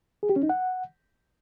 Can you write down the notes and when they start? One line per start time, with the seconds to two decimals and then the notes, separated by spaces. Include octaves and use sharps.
0.23 G#4
0.30 G4
0.36 C#4
0.43 D#4
0.49 F#5